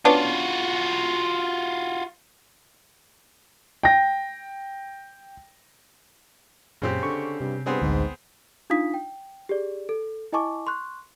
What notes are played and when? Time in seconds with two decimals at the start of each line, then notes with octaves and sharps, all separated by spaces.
0.05 B3 C#4 D4 F4 F#4
3.83 G5 A#6
6.82 F#2 A#2 C#3 C4 G4
7.03 D3 C#6
7.41 G2 C3
7.66 G2 B3 C4 G#4
7.82 A1 D2 G#2
8.70 D4 D#4 F4 F5 D#6 B6
8.94 G5
9.49 G4 G#4 D5
9.89 A4
10.32 E4 D#5 G#5 A5 C#6 D6
10.67 C6 C#6 F#6